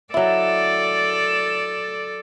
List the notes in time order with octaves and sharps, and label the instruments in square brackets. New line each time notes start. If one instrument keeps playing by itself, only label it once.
[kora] F#3 E4 [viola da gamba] A4 D5